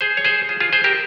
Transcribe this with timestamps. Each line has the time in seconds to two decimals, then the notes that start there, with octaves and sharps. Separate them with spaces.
0.01 G#4 C5
0.17 C#5
0.25 G#4 C5
0.49 F4 G#4
0.60 F4 G#4
0.73 G#4 C5
0.84 G4 A#4